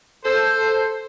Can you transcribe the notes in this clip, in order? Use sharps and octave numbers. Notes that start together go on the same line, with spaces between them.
A4 C5